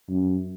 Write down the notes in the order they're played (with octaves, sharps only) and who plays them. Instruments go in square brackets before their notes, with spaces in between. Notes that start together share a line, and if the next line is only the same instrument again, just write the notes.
[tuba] F#2